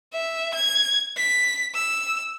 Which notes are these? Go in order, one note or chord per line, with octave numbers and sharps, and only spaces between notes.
E5
G#6
B6
E6